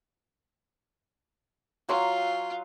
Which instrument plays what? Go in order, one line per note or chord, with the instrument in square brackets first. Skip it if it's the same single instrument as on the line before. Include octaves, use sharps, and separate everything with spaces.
[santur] F#3 G#5 C6 [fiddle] F4